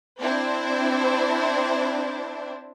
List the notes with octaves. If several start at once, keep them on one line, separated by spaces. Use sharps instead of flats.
C4 D4 E4 C5